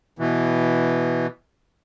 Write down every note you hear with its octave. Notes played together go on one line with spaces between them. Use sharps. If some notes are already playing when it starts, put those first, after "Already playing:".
B2 E3